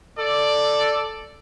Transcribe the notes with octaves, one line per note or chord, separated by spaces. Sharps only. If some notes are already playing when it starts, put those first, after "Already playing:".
A4 D5